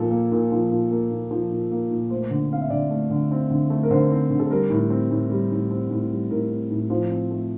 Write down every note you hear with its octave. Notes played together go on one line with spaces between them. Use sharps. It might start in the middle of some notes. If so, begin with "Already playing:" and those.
Already playing: A#2 F3 A4
A#3
A#2
F3
A#2
A#3
A#2
F3
A#2
A#3
A#2
A3 C5
D3
C4 F5
E5
D3 D5
A3
D3
C4
D3
A3
A#4
D3 C5
C4
D3
A4
G3 A#4
A2
C4
A2
G3
A2
C4
A2
G3
A2 A#4
C4
A2
F3 C5
C4
A3